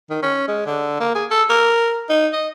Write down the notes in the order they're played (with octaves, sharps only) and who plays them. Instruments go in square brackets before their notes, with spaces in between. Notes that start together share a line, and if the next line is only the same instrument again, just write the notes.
[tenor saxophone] D#3
C#4
G#3
D3
A#3
G#4
A4
A#4
D#4
D#5